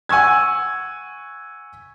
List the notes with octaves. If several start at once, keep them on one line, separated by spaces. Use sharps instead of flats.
F#5 G#5 C#6 E6 G#6